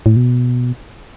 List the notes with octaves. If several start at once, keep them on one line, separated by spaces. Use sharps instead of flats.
A2
B2